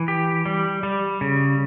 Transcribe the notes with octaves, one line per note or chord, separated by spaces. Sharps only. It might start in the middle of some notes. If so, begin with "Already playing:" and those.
Already playing: E3
G4
G3
G3
C#3